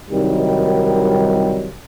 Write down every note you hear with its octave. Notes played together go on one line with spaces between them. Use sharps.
C2 D#3 F#3 G3